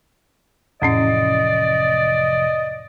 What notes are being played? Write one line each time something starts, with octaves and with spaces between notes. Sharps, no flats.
F1 F2 A2 E3 C#4 D5 D#5